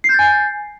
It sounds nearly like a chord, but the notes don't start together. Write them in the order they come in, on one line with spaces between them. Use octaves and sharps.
C7 G6 A6 G#5